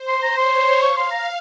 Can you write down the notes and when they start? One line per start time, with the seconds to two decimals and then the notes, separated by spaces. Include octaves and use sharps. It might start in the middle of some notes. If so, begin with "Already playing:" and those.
Already playing: C5
0.08 C6
0.23 A#5
0.37 C#5 C6
0.82 F5 C#6
0.97 C6
1.11 A#5